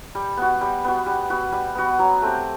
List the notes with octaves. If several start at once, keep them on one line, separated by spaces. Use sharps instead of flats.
G3
B3 F#4
G3
B3 F#4
G3
B3 F#4
G3
B3 F#4
F#3
A3 C4 G4